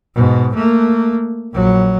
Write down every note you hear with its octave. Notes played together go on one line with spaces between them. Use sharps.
G#2 B2
A3 A#3
A#1 F#3